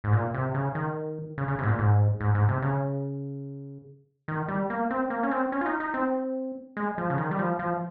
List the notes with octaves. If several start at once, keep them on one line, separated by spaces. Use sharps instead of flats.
G#2
A#2
C3
C#3
D#3
C#3
C#3
C3
G#2
A#2
G#2
G#2
G#2
C3
C#3
D#3
G3
A#3
C4
A#3
C#4
C4
C#4
F4
D#4
D#4
C4
G#3
F3
C#3
D#3
G3
F3
F3